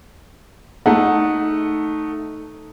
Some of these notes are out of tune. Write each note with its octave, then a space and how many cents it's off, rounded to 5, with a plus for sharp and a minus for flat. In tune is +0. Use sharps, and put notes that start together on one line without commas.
A3 +0 D#4 +0 F#5 -10